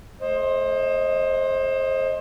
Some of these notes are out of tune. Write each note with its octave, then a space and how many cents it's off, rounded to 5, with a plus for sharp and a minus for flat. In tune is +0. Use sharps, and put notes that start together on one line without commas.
A3 -30 C5 +25 D#5 +0